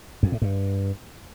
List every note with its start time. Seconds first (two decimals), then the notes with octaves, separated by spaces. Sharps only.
0.23 F2
0.32 A2
0.42 G2